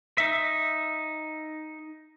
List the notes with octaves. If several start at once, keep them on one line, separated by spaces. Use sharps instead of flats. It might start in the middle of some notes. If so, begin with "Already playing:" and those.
D#4 E5